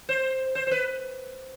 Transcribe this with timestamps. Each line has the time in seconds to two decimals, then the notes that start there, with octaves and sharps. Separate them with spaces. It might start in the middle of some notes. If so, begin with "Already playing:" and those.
0.09 C5
0.55 C5
0.67 C5
0.71 B4